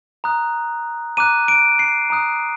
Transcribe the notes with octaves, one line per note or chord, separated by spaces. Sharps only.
A#5 D#6 F#6
A#5 D6 F#6 D#7
D7
C7
A#5 D#6 F#6